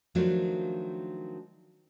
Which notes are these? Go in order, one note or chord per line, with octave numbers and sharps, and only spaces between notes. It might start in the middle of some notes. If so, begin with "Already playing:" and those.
D#3 F3 F#3 A3 D4 F4